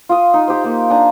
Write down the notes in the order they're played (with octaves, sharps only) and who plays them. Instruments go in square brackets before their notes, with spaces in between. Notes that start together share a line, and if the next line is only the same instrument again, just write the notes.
[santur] F4 D#6
D#4
G4 C5
A#3
D4 G#5 A#5